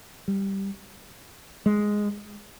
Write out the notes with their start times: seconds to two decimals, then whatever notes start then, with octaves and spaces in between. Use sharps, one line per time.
0.28 G3
1.66 G#3